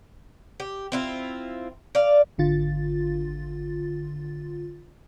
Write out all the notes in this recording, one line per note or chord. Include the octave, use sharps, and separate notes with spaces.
G4
C4 E4 F4
D5 F5
G#1 D3 F4 A6